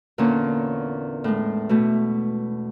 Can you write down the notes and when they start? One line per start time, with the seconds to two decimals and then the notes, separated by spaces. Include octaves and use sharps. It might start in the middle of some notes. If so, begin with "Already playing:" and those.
0.18 E2 A#2 D3 A#3 C#4
1.24 A2 G#3
1.69 B2 A3